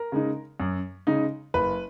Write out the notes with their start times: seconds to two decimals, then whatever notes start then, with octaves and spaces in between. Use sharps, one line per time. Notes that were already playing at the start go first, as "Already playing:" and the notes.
Already playing: A#4
0.12 C#3 G#3 D#4
0.60 F#2
1.07 C#3 G#3 D#4
1.54 F#1 B4